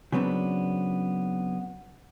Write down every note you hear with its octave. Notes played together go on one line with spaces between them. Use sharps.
C#3 F#3 B3 C4 D4